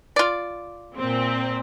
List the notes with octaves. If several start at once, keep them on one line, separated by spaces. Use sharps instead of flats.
F4 D5
A#2 C4